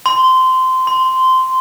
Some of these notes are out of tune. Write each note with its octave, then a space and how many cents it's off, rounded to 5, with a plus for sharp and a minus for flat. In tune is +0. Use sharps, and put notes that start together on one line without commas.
C6 -20
C6 -15